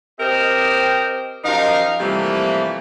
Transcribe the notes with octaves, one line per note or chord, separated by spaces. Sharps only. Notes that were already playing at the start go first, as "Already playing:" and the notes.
C4 G4 A#4 C5 D#5 G5
F#2 F3 D#4 G4 A#4 F5
C3 E3 F3 G3 A3 A#3